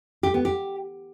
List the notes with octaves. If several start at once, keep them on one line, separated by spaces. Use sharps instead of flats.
G4
B3
G4